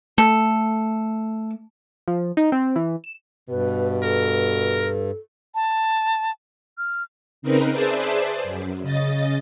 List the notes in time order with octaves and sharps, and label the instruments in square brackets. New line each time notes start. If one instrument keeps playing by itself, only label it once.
[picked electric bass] A3 [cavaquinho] A4
[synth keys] F3
D#4
C4
E3
E7
[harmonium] G2 [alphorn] B2 [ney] B4
[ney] A4 [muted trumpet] A#4
[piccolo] A5
F6
[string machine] C#3 C4 D#4 A#4 B4
G#4 B4 C5 D5 E5 A5
F#2
C#3 D#5 A6